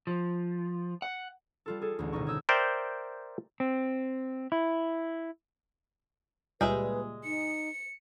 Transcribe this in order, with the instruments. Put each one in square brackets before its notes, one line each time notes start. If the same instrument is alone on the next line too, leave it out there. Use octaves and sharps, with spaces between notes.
[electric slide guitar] F3
F#5
[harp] G3 F4 A4
G#4 A4
A1 D2
G#1 B2 D3 D#4 C#6
C#5 D#6 E6 G6
[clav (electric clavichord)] A#4 C5 D5 E5 G5
[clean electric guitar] C4
E4
[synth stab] C#2 A#2 G3 [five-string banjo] G#3 G#4 E5 [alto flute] B4
[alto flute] D#4 [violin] C#7